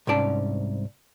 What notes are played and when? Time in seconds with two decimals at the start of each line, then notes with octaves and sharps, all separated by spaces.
0.07 C2 G#2 C#4 D5 A5